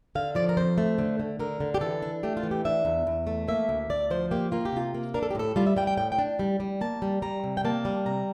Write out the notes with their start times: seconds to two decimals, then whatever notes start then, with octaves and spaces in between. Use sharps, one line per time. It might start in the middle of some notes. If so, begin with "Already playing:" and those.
0.15 D3 F5
0.35 F3 D5
0.49 A#4
0.57 F2 C5
0.78 A3
0.98 D3
1.20 D3
1.39 D3 A#4
1.60 D3
1.74 G4
1.81 E3 A4
2.02 D4
2.23 A3 G4
2.37 F4
2.43 E3
2.51 G4
2.65 D4 E5
2.85 E2
3.07 E2
3.27 A3
3.48 A#3 E5
3.69 D2
3.90 D2 D5
4.10 F3 C5
4.31 A#3 G4
4.52 A#3 F4
4.65 G4
4.72 C3 F4
4.94 A#3
5.14 D4 A#4
5.23 A4
5.31 G4
5.35 A2 A4
5.56 G3 F4
5.66 E5
5.77 G3 G5
5.87 G5
5.97 A2 G5
6.12 G5
6.19 D4
6.39 G3
6.60 G3
6.81 A#3 A5
7.02 G3
7.22 G3 A#5
7.44 C3
7.57 G5
7.65 A#3 A5
7.85 G3
8.06 C3 A#5